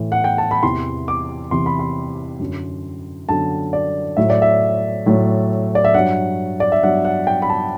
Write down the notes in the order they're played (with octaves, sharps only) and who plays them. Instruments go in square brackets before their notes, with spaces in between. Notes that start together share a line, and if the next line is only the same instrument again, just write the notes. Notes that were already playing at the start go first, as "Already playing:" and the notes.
Already playing: [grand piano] A2 E3
F#5
G5
A5
B5
E2 C3 E3 C6
D6
E2 C3 E3 C6
B5
C6
F#2 D3 F#3
F#2 D3 F#3 A5
D5
A2 F#3 E5
D5
E5
A2 F#3
D5
E5
G2 F#3 F#5
D5
E5
G2 F#3 F#5
F#5
G5
B5
A5